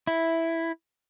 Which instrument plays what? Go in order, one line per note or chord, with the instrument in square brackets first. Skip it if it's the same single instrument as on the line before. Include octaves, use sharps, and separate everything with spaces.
[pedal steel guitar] E4